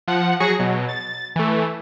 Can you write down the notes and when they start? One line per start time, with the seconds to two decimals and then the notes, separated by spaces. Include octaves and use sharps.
0.08 F3 F#5
0.40 F#3 F#4 G#4 A#6 C#7
0.59 B2 F#3
0.89 A6
1.36 E3 A3